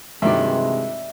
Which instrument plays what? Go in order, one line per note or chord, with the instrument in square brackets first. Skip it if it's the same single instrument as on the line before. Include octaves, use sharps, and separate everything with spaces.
[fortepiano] G2 D#3 F#3 [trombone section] C3 E3 G#3 [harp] D5 E5